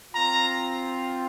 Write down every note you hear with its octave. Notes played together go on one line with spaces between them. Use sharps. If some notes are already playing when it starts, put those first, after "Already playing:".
C4 F4 A#5